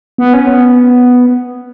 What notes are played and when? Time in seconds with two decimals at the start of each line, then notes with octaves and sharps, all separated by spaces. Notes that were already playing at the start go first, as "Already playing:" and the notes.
0.18 B3
0.34 C#4
0.47 B3